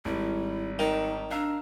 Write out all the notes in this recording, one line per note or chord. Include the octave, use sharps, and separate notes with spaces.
G#1 G3 E4
D#3 D#4
D4 F5 A#5 E6